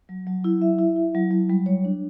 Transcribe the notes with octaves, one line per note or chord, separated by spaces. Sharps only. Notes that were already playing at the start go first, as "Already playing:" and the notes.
F#3
F#3
E4
E5
E4
E4
F#3
F#3
G3
C#5
D4